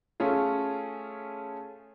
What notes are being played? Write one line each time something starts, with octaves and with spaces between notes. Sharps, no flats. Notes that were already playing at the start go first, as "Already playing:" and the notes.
A3 C#4 F4 G#4